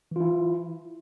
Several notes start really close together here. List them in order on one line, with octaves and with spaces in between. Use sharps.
E3 F4 E4